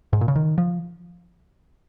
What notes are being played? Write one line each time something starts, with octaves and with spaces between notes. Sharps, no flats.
G#2
A#2
C#3
D#3
F3